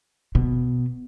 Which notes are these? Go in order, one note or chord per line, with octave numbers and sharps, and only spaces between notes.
B2